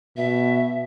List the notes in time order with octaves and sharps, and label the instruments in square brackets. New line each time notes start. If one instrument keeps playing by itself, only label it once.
[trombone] B2 [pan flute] E5